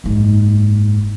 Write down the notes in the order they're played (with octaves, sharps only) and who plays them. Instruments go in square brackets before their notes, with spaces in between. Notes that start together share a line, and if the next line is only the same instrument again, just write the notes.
[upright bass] F#1 G#2